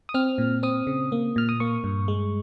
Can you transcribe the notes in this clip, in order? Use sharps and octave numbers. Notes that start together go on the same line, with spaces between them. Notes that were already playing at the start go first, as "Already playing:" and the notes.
D#6
C4 F6
A#2
C4 D#6
C#3
A#3
A#2 F6
D#6
A#3 C#6
G2
G#3